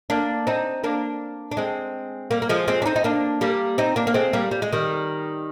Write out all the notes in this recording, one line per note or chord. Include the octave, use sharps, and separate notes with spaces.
A#3 D4
C4 D#4
A#3 D4
D4
G#3 C4
G3 A#3
A#3
F3 G#3
G#3 C4
D4
C4 D#4
D#4
A#3 D4
G3 A#3
C4 D#4
A#3 D4
A#3
G#3 C4
G3 A#3
G3
G#3
D#3 G3